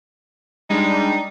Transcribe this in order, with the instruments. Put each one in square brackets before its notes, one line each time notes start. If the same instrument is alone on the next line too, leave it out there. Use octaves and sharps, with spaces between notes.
[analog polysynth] G3 G#3 D4 [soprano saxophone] D#4